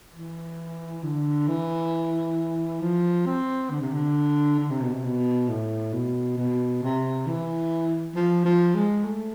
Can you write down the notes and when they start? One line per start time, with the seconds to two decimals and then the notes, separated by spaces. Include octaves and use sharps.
0.14 E3
1.03 D3
1.48 E3
2.81 F3
3.26 C4
3.71 D3
3.81 C3
3.92 D3
4.60 D3
4.70 C3
4.81 B2
4.92 C3
5.04 B2
5.49 A2
5.93 B2
6.38 B2
6.82 C3
7.26 E3
8.15 F3
8.45 F3
8.75 G#3
9.05 A3